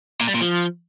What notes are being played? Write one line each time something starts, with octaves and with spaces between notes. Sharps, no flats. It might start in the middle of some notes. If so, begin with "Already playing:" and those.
A#2
G3
A#2
F3